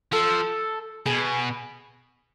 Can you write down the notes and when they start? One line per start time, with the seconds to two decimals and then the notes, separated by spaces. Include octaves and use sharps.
0.12 F3 A4
1.06 B2 G#4